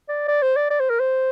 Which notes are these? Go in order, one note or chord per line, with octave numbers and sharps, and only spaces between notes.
D5
D5
C5
D5
D5
C5
A#4
C5